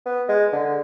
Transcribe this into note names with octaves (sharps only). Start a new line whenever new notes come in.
B3
G#3
D3